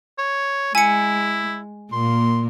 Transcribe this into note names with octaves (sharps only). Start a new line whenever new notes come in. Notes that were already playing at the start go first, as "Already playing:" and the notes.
C#5
G#3 E4 G#5 C#7
A#2 A#3 C6